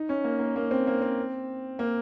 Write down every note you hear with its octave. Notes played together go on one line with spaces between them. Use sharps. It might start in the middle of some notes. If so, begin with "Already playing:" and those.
Already playing: D#4
C#4
A#3
A#3
A#3
C4
A#3
C4
A#3